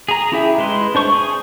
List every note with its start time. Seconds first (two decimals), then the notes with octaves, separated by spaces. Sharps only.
0.09 G#4 A#5
0.32 C#4 E4 G4 G#4 E5
0.58 G#3 E4 B4 C6
0.95 D4 C5 C#6
1.12 G#4